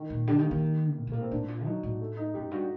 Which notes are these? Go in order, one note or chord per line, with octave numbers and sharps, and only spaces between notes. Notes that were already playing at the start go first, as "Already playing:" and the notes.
Already playing: D#3
A#2
D3 G3
D#3
A#3
D#3
A2
A#2
A2 A#3
C4
A2 D4
A#2
F#3 D#4
A2 F#4
A3
D#4
F#2 G4
G2 F#4